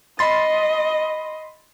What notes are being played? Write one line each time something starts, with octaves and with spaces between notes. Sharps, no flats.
D#5 B5 C6 A6